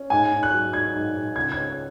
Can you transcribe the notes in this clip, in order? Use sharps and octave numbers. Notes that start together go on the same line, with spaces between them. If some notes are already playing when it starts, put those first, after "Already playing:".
Already playing: C#4
G#2 G#5
G#2
F#6
F#3
D#4 G#6
G#2
G#2
C#2 G#6
G#6
C#4